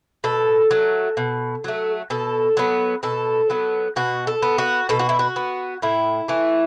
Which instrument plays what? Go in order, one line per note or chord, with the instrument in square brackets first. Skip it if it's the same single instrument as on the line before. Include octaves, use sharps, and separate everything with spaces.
[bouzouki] B2 A4
F#3 A3
B2
F#3 A3
B2 A4
F#3 B3
B2 A4
F#3 B3
B2 F#4
A4
B3
F#4
B2 A4
F#4
E4
F#4
B3
A2 E4
E3 A3